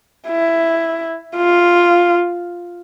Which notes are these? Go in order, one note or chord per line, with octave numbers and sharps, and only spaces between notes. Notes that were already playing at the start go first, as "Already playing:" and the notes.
E4
F4